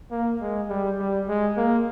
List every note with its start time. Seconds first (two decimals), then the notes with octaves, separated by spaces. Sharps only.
0.11 A#3
0.41 G#3
0.70 G3
0.99 G3
1.28 G#3
1.57 A#3